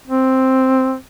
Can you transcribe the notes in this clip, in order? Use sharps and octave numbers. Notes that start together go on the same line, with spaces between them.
C4